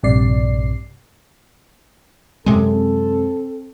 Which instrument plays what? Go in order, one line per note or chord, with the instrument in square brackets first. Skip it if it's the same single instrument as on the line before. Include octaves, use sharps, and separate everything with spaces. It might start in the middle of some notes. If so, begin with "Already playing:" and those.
[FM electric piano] A#1 G2 C3 D5 C7
[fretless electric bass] F#2 C3 G#3 [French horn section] C4 A4